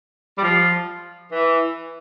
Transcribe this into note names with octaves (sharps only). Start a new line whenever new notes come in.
G3
F3
E3